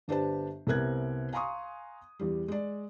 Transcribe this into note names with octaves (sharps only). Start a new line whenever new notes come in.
G1 D4 G4 B4 C5 A5
C2 C3 B3 A#4 F#6 G#6
F5 G#5 A#5 C6 C#6 D#6
E2 G3
G#3 D5